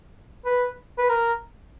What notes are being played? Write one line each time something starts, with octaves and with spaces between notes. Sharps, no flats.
B4
B4
A#4